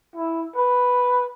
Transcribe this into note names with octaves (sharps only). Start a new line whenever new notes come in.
E4
B4